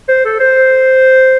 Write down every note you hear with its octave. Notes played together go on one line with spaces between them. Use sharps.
C5
A4
C5